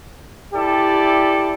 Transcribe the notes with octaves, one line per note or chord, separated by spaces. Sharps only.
E4 G4 A4 D5